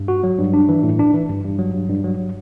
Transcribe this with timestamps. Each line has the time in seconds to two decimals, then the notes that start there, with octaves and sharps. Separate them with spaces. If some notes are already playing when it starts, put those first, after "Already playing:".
Already playing: G2
0.08 F#4
0.23 F#3
0.38 G2
0.54 D4
0.69 E3
0.83 A2
0.99 D4
1.13 E3
1.29 G2
1.44 G2
1.59 F#3
1.74 G2
1.89 G2
2.04 F#3